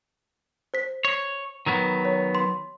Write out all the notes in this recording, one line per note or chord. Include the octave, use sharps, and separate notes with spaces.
C5 B6
C#5
D#3 F#3 B3
C#5
C6